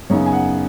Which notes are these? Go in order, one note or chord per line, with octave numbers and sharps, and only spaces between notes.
F#2 C#3 B3 D#4 C#5
G#5
F#5